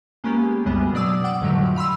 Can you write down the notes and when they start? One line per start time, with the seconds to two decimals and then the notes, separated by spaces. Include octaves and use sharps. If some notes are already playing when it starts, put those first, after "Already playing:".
0.24 G#3 A#3 B3 C#4 G4
0.65 C2 F#2 C#3 G3 G#3 B3
0.93 B2 F#3 D4 D5 D#6 E6
1.24 F#5 G5 D6 E6
1.41 F2 A2 D3 D#3 F#3 G3
1.76 F5 B5 C6 E6